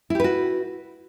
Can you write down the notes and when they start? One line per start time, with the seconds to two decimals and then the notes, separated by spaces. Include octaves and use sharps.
0.10 E4
0.15 G4
0.20 B4
0.24 F#4